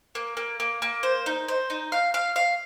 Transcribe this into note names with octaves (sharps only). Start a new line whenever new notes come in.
A#3
A#3
A#3
A#3
C5
D#4
C5
D#4
F5
F5
F5